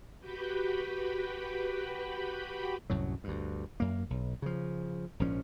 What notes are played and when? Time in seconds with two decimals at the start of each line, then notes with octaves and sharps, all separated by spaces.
0.19 F#4 G4 B4 G5 B5
2.90 C2 F#2 A2 F#3
3.24 D2 G2
3.80 F#2 A#3
4.10 B1
4.42 C#3 F3
5.20 A#1 G#2 F3 C#4